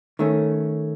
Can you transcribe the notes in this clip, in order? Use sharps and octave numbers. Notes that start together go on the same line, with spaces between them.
D#3 A3 C#4